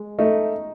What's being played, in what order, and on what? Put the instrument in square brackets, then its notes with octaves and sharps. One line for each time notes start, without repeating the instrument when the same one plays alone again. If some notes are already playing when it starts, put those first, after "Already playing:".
Already playing: [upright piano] G#3
[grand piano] A3 [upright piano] D#4